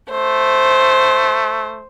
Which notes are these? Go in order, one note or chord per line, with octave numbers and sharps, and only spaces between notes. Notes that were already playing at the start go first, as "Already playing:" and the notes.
A3 C5